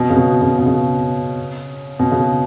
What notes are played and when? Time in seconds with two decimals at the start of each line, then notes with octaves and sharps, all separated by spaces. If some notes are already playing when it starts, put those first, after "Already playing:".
Already playing: B2
0.10 C#3
0.16 B2
0.41 C#3
0.58 B2
0.66 C#3
1.99 B2
2.11 C#3